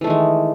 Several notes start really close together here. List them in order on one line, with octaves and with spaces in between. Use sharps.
E3 A3 D#3 G#3